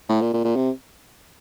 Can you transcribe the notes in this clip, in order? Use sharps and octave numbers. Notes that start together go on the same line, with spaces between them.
A2
A#2
A#2
A#2
C3